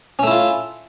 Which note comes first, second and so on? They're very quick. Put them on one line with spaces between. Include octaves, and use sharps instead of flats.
C#4 A3 E4 F4